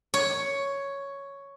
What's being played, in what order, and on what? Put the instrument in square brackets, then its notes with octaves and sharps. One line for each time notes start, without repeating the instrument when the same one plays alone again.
[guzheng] C#5